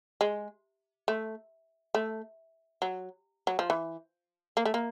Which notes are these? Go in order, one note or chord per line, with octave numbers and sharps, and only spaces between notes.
G#3
A3
A3
F#3
F#3
F3
E3
A#3
A3
A#3